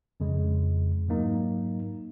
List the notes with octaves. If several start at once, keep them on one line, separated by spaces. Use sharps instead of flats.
F2 C#3 G#3
G#2 F#3 A#3 D#4